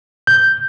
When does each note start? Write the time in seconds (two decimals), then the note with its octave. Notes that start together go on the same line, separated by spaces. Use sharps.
0.27 G6